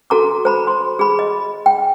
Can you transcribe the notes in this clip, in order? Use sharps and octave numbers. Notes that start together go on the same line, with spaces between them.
F#4 A4 A#5 D6
C5 A#5 B5
C6
G#4 B5
D#5
G5